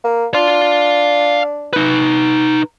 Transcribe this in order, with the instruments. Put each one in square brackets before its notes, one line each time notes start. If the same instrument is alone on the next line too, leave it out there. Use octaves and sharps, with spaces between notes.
[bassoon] A#3
[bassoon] D4 [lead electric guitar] F5 C6
[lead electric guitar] D#4 B4